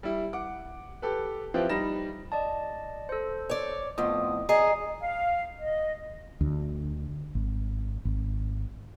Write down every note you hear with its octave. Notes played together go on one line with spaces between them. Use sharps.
G3 E4
F#5 D6
G4 A4 B4
F3 C4 E4 F4 G4 B4
G3 D#4 B5 A#6 E7
D5 D#5 A5
A4 C5
C#5 D5
F2 A2 B3 F4 D#6
G#4 D5 D#5 A#5 C7
F5
D#5
D2
G#1
G#1